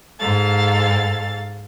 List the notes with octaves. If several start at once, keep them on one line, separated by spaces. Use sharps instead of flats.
G#2 A4 F5 A6